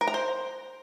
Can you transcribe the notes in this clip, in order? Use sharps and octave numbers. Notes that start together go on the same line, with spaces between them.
A#4
A#5
C5